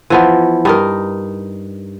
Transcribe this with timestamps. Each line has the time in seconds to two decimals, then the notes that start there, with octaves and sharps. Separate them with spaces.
0.10 E3 F3 B3
0.65 G2 D#4 A#4